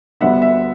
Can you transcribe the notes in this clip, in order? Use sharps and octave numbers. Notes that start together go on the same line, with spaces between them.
D2 D3 G3 B3 D4 E5 F#5
E5